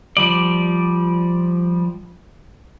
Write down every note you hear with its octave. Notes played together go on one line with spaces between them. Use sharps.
F3 G3 D5